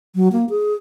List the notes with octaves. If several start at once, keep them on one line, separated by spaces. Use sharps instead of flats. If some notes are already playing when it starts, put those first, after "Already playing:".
F#3
A#3
G#4